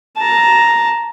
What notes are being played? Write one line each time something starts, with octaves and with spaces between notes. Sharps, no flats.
A5 A#5